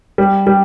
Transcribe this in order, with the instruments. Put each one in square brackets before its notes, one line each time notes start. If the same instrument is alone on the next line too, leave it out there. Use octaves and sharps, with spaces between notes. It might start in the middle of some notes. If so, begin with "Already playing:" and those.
[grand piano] G3
G3